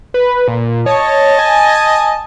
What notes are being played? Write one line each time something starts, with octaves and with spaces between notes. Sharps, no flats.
B4
A#2
C#5 D#5 A5
G#5